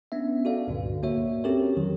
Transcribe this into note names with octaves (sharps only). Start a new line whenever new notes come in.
B3 C#4 D4 E5
F#4 A4 D5 F5
C#2 G2 A#2 D3
A#3 F#4 C#5 E5
C4 C#4 G4 A4 A#4 C#5
F2 D3 D#3 F#3